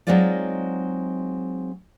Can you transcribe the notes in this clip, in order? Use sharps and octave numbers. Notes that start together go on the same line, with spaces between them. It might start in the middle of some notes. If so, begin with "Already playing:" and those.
F#3 G#3 C4 D#4 F4 D5